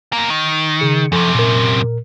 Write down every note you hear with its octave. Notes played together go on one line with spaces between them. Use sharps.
F#2 A#3
D#3
C#3 G#4 C#7
F#2 C3 F3 A4 C#6
A#2 A#4